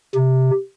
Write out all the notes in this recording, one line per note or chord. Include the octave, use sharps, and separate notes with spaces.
C3